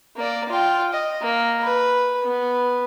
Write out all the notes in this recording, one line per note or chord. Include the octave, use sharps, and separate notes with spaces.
A#3 D5
F4 G5
D#5
A#3
B4
B3